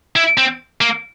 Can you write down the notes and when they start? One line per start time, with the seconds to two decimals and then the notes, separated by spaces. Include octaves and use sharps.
0.16 E4
0.38 C4
0.81 A#3